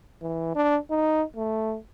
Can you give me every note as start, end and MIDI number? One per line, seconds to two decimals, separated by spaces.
0.22 0.52 52
0.56 0.77 62
0.91 1.23 63
1.36 1.77 57